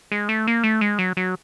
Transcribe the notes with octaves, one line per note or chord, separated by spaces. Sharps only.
G#3
A3
A#3
A3
G#3
F#3
F#3